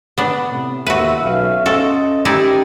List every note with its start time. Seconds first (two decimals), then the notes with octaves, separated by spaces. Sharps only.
0.18 B3 D4
0.50 A2 C3
0.86 D#2 F4 F#4 A4 B4 E5
1.23 B1 C#4 E5 F5
1.66 C#4 F#4 A4 C5 D#5
2.25 A2 D#3 D#4 E4 G4 D5